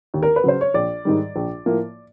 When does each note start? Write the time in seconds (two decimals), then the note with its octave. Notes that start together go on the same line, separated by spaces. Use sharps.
0.14 D#2
0.23 A#4
0.36 B4
0.44 C#3 F#3 C5
0.61 C#5
0.74 A#1 D5
1.05 G#2 D#3 G3
1.36 A#1
1.66 A2 F3 A#3